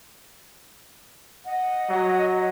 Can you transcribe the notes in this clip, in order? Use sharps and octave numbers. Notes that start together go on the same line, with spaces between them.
D#5 F#5
F#3